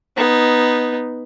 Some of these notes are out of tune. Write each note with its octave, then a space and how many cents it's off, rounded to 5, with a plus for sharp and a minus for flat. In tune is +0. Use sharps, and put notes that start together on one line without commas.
B3 +0 D#4 +0